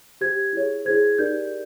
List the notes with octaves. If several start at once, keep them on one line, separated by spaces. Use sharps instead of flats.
G4 C5 G#6
E4 G#4 C#5
E4 G#4 C5 G#6
D#4 G4 A#4 D5 G6